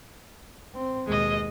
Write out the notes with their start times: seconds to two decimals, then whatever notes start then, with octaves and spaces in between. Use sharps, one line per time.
0.75 C4
1.07 D#2 B2 G#3 D#5